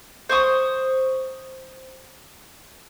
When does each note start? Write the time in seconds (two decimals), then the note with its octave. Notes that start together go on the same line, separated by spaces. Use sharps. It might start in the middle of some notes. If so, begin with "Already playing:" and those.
0.29 C5 C#6 D#6